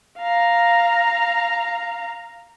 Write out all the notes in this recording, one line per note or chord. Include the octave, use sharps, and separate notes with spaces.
F5 A#5